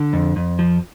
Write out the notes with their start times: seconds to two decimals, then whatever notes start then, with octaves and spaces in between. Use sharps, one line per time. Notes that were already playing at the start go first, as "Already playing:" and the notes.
Already playing: D3
0.13 F2
0.36 F2
0.59 F3